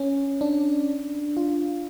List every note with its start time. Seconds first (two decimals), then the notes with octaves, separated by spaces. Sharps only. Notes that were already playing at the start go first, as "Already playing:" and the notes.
Already playing: C#4
0.41 D4
1.37 F4